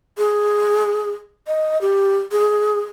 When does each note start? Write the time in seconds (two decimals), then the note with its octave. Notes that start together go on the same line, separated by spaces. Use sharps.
0.18 G#4
1.47 D#5
1.81 G4
2.32 G#4